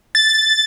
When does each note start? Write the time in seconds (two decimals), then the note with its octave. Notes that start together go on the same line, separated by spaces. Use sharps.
0.15 A6